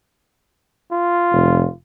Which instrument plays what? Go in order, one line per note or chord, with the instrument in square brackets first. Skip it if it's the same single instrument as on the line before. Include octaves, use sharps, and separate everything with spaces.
[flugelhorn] F4
[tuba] F1